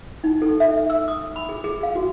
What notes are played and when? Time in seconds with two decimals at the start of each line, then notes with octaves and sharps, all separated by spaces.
0.24 D#4
0.42 A4
0.60 E5
0.90 E6
1.08 D#6
1.36 B5
1.49 G#4
1.64 G#4
1.83 F5
1.95 F#4